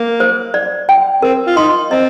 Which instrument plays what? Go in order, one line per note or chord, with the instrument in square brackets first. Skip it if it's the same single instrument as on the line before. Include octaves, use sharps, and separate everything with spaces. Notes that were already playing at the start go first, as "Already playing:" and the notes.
Already playing: [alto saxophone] A#3
[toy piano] C5
D5
G5
[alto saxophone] C4 [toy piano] A#4
[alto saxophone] F4
[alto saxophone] D#4 [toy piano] C6
[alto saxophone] C4 [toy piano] D#5